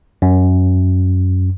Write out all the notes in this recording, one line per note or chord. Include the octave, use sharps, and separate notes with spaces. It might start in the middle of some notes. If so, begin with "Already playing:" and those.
F#2